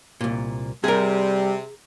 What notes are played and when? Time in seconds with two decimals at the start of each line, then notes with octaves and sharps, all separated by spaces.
0.21 C2 A#2
0.84 C3 G3 G#4 A#4